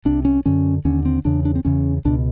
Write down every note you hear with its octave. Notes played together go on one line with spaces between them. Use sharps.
C2 C3 D4
C#4
F#2 D3 C#4
D#2 D3 C#4
C4
E2 C#3 D4
D4
C4
E2 C#3 C#4
C#2 B2 D4